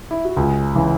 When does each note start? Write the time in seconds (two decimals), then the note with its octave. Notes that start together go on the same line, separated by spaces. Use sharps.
0.11 E4
0.25 F#4
0.37 C#2 G#4
0.75 C#3 E3